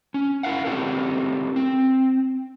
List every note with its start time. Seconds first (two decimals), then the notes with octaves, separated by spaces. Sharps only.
0.14 C#4
0.43 E4 A#4 F5 F#5
0.65 C4 E4 G4 A4 A#4
1.56 C4